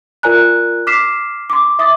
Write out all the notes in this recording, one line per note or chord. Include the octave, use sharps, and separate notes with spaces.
F4 A#4 D5 G#5 A#5 F#6
D6 F6 B6 C7 E7
C6 D6
E5 D6 D#6 A6